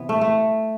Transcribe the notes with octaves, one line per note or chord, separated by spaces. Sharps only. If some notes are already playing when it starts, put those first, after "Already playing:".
Already playing: C3 E3 B3
A3
A3